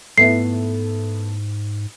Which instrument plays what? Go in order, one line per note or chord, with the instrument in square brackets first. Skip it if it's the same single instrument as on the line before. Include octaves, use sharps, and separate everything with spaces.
[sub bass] G#2 [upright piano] A3 B3 E4 [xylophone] C7